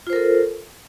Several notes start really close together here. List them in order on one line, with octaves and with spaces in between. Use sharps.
F4 C5 A#4 A4